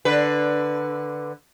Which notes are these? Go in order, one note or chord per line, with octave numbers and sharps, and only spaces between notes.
D3 B4